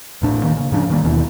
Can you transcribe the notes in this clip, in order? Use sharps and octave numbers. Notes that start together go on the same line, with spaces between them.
A1 A2 D4
D#3 A#3
C#3
G#2 F3 C#4 D4
D#3 G3 A#3
D#2 B2 D#3 E3